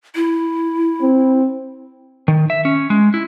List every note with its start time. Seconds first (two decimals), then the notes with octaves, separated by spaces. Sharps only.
0.15 E4
1.01 C4
2.28 D#3
2.50 E5
2.65 C#4
2.90 G#3
3.14 E4